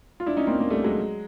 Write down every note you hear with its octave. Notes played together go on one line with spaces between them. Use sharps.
F4
D4 E4
C#4 D#4
A#3 C4
A#3
G3 A3
F#3 G#3